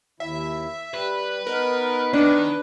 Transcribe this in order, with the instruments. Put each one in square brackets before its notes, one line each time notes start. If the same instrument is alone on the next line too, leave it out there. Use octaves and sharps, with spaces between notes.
[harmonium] D#2 E4 [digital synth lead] E5
[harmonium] G3 [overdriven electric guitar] B4
[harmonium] B3 D#4 [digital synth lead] A#4
[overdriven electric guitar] D#3 [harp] D4 [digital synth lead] B4